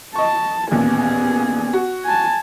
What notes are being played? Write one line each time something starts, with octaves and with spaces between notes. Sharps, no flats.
D#5 A5 C#6
A1 D#2 A#2 B3 G#4
F#4
G#5 A5